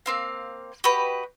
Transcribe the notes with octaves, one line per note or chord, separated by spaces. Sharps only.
A#3 C4 F5
F#4 G4 B4 D#5